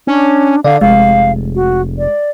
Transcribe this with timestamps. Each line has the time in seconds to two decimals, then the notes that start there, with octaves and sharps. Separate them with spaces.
0.07 C#4 D4
0.64 D3 D5 F5
0.81 F1 G#3 F5
1.55 F#4
1.98 D5